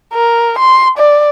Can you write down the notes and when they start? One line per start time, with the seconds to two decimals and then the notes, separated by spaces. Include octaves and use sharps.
0.14 A#4
0.59 C6
0.98 D5